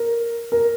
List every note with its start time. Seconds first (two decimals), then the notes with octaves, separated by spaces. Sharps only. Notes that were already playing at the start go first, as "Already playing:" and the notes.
Already playing: A#4
0.52 A#4